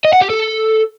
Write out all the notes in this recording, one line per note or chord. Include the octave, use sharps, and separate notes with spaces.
D#5
F#5
G4
A4